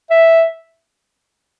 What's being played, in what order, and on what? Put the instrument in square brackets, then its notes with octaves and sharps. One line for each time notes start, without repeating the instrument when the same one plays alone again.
[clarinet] E5